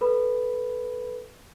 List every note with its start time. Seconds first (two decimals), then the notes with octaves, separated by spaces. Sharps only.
0.01 A4 B4 B5